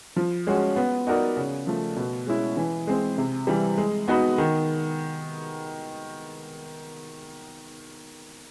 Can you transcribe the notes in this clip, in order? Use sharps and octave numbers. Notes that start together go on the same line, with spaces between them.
F3
G#3 C#4 F#4
B3
D#4 F#4 A#4 D5
C#3
F3 A3
B2
G#3 C#4 E4
E3
G#3 C4
C3
E3 G3
G#3
B3 D#4 F#4 B4
D#3